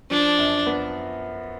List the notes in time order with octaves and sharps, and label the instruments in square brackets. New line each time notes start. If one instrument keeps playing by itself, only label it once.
[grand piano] F3 [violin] D4
[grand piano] F#2
B3